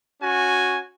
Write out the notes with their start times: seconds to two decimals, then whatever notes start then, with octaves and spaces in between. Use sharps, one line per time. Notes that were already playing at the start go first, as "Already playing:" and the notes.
0.21 C#4 F#4 G#5